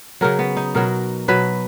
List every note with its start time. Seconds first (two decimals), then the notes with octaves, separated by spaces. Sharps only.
0.21 C#3 F#3 A#4
0.39 B3
0.57 D#4
0.75 B2 F#3 A#4
1.28 B2 F#3 B4